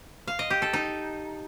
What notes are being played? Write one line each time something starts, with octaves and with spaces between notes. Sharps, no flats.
F5
D#5
G4
A4
D#4